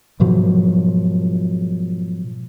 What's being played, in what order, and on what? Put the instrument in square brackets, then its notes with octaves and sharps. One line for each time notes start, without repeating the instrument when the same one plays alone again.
[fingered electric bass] G#2 B2 F3 F#3